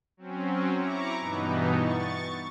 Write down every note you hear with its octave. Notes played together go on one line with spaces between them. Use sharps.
F#3 C4 C#4
E4 A#5 C#6 D6
G2 B2 E3 B3 D#4
C#6 A6